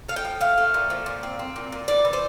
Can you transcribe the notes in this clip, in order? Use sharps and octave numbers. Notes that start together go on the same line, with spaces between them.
A3 F5
G5
F3
A3 F5
A3
A#2
F3
A#2
C4
C4
A#2
A#2
E3 D5
E3
C5